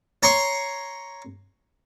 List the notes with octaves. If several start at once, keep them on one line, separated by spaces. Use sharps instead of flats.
C#5 A#5 C6 C#6